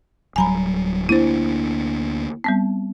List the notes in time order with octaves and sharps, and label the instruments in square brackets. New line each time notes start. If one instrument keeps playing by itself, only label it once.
[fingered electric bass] D1 F#3 G3 [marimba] G#5 A#5 B5
[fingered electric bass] D2 A#3 D4 [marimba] E4 C5
[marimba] G3 B3 C4